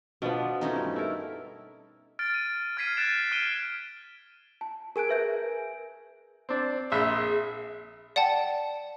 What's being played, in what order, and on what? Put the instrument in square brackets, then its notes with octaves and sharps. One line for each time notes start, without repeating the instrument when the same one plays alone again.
[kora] B2 F3 B3 [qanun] D4
[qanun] A3 C#4 D#4
[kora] G2
E4 A4 A#4
[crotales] F6 A6 D7
D#7
F6 G#6 B6 C7 D#7
F#6 A6 D7 E7
F6 D7 D#7 G7
[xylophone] A5
[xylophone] G#4 F#6 [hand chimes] A#4 G#5 D7
[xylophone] B4 E5 G6
[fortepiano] C4 D4
[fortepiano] A#1 E5 [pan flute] G#4
[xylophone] D5 F#5 G5 A5